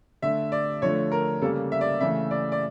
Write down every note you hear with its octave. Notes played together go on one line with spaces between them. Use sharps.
D3 A3 E5
D5
D3 F3 A3 C#5
A#4
C#3 G3 A#3 A4
E5
D5
C#3 E3 A3 E5
D5
D5